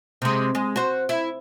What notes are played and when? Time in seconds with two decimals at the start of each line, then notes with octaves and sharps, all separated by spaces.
0.22 C3 G#3
0.55 G#3
0.76 F#4 C5
1.09 E4